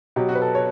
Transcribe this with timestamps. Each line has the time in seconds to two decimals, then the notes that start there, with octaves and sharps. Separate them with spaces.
0.16 B2 F#3 G4
0.29 F#4
0.35 B4
0.42 A4
0.55 C#5